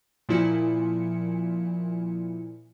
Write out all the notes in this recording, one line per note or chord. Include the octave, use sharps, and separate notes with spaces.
A#2 F3 E4 G#5 C#7